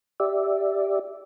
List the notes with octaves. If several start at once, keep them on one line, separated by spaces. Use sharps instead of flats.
G4 D5 E5